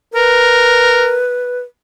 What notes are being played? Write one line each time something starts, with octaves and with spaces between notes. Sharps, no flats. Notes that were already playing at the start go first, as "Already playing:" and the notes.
A#4 B4